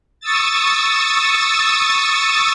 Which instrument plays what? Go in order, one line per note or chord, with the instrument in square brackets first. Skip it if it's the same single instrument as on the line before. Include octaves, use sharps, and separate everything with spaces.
[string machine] C#6 D#6 E6 A6